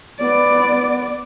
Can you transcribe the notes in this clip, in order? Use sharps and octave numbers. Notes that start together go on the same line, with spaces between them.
B3 D5